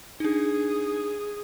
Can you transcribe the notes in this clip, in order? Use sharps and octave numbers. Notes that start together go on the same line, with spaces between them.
D4 D#4 G#4